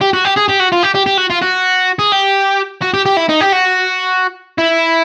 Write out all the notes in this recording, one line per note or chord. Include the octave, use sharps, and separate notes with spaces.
G4
F#4
G4
G#4
G4
F#4
F4
G4
G4
G4
F#4
F4
F#4
G#4
G4
F#4
G4
G4
E4
D#4
G4
F#4
E4